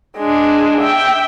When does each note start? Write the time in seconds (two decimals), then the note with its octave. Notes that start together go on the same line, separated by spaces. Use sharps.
0.18 G#3 D4
0.81 E5 G5